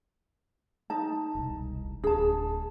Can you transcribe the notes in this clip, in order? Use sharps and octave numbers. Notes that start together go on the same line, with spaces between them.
D#4 A5
E1 C2
D1 D4 G#4 A5